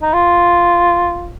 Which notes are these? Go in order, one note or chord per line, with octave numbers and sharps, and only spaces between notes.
D#4
F4